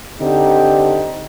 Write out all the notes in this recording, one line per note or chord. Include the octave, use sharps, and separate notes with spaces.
D3 C4 D#4 G4